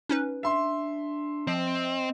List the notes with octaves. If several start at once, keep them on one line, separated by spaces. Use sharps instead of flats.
C#4 D#4 B4
D4 E5 C6
F3 C4 D#5